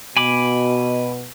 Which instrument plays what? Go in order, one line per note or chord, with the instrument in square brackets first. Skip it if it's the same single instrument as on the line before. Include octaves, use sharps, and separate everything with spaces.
[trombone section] B2 [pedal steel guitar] G#5 B5 D6